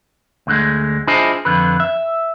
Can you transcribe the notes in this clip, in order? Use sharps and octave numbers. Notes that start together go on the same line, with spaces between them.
D2 D3 G#3
D4 E4 F4 G#4 C5 D#5
F2 D3 B4
E5